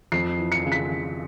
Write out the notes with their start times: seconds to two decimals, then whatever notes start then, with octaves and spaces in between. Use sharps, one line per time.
0.12 F2 C7
0.38 E3
0.52 C#7
0.65 C#3
0.72 B6
0.91 C#3